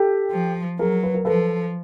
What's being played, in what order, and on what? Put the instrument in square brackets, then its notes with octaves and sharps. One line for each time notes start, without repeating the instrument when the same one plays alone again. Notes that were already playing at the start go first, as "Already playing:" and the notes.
Already playing: [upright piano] G4 A4
[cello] F3
[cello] F#3 [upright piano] G#4 A#4
[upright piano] B4
A#4
[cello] F3 [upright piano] A4 B4